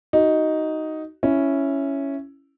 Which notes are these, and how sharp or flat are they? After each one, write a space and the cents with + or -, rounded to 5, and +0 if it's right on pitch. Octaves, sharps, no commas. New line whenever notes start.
D#4 +5 F#4 +20
C#4 +0 E4 +5